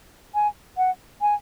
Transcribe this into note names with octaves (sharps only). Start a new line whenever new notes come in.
G#5
F#5
G#5